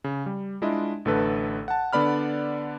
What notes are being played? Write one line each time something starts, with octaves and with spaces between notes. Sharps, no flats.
C#3
G3
G#3 D4 E4 F4 D#5
A1 D3 A3 A4 B4
F#5 A5
D3 B3 D5 B5 F6